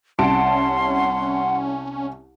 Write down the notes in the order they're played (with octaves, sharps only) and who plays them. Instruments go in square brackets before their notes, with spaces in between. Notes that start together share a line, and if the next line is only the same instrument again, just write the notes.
[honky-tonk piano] C2 A5 D7 [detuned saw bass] C#4 [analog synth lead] F#5 [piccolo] C6